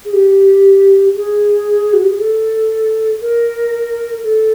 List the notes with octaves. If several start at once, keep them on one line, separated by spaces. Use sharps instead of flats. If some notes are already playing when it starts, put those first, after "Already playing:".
G#4
G4
G#4
F#4
G4
G#4
A4
A#4
A4